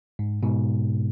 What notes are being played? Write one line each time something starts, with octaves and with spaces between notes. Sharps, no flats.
G#2
G#2 B2